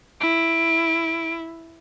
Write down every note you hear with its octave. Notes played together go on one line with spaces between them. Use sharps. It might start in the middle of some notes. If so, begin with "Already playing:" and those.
E4 D7